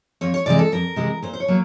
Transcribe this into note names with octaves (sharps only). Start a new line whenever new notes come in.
F2 C#5
C#5
C3 E3 G#3 D5
A4
F2 A#4
C3 E3 G#3
A#2 C5
C5
C#5
F#3 A#3